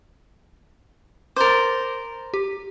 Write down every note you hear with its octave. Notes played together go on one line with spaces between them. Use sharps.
A#4 C5 D6 A6
G4